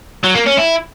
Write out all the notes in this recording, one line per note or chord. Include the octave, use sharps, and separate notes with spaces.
F#3
A#3
C#4
E4